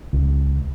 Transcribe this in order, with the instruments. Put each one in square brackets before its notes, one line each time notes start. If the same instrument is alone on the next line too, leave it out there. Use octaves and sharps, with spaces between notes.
[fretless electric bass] C#2